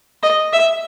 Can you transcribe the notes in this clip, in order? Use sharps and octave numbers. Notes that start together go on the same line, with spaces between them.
D#5
E5